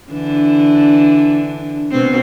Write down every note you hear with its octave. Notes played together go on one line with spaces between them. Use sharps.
D3 E3 D4
B2 C4